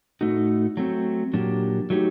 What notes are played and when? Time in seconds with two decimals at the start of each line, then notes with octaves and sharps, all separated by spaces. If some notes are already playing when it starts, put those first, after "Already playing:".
0.21 A2 A3 D#4 F#4
0.77 F#3 A3 C4
1.33 A#2 F#3 A#3 D4 G4
1.90 F#3 A3 D#4 G4